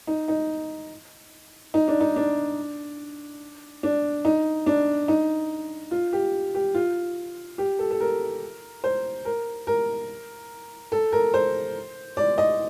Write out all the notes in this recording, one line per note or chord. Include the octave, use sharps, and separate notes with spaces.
D#4
D#4
D#4
D4
D#4
D4
D4
D#4
D4
D#4
F4
G4
G4
F4
G4
A4
A4
A#4
C5
A#4
A#4
A4
A#4
C5
D5
D#5